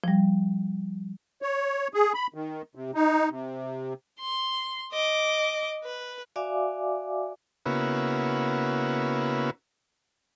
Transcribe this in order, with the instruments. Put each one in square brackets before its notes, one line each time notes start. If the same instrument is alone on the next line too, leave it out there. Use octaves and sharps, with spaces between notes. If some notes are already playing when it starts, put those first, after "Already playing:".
[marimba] F3 G3
[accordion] C#5
G#4
B5
D#3
C3
D#4
C3
[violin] C6
D#5 D6
B4
[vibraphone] F#4 D5 E5 F5 G#5 D6
[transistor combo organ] C#3 A#3 B3 E4 F#4